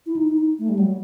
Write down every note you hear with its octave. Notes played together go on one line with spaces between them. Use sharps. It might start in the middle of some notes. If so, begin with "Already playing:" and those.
E4
D#4
D#4
D#4
A3
G3
F#3